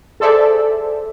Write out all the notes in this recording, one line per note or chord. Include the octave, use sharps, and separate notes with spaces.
G#4 A4 C5 D5 E5